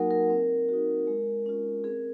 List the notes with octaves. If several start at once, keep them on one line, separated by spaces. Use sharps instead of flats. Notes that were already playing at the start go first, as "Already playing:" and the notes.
Already playing: F#3 A#3 D#4 F#4 A#4 F#5 G#5
A#4
C4
D#4 F#4
G#3
C#4 F4
C4 G#4